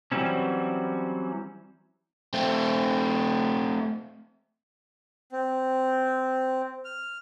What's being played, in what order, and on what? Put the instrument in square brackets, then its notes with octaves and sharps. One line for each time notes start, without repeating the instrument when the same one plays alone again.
[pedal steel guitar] E3 F#3 G3 C4 C#4
[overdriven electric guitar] A3 C4
[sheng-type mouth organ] C4
F6